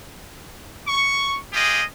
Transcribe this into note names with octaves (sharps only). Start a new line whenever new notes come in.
C#6
F4 G4 G#4 D#5